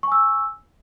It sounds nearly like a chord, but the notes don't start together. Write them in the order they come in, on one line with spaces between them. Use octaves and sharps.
C#6 G#5 E6